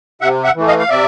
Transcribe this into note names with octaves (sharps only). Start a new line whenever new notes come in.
C3 E5 F#5
E5 F#5
E3 A3
D#5 F5
F5
C3 D5 E5